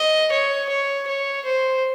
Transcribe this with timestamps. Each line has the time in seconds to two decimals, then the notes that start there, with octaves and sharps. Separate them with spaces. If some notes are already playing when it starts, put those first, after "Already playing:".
Already playing: D#5
0.31 C#5
0.69 C#5
1.07 C#5
1.45 C5